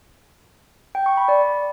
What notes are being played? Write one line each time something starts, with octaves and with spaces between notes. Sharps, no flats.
G5
C#6
B5
D5